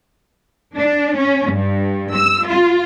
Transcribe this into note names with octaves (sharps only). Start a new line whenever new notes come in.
D4
C#4
G2
E6
F4